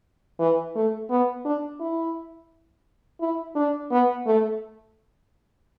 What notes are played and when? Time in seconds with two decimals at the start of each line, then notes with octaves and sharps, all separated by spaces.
0.39 E3
0.75 A3
1.10 B3
1.45 D4
1.80 E4
3.21 E4
3.55 D4
3.91 B3
4.26 A3